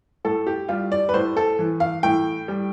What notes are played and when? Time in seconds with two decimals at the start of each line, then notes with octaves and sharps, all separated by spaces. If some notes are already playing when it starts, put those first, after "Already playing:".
0.25 A2 A4
0.47 G4
0.69 G3 F4
0.92 D5
1.09 B4
1.14 A2 C5
1.37 A4
1.59 E3
1.80 F5
2.03 A2 G5
2.48 G3